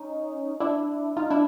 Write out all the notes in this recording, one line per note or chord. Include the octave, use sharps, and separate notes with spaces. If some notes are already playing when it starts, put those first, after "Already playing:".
Already playing: C#4 D#4
D4 E4
D#4 F4
D4 E4